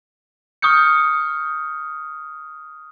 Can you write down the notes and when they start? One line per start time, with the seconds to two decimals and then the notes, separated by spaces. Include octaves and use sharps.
0.62 C#6 D#6 F6 G6 C#7